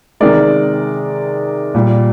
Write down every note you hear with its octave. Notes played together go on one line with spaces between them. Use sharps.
C3 D#3 G#3 A#4 D5
A#2 G3